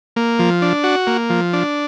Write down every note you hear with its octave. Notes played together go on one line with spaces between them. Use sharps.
A#3
F3
D4
F#4
A#3
F3
D4